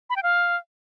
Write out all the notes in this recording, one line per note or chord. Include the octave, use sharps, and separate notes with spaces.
B5
G5
F5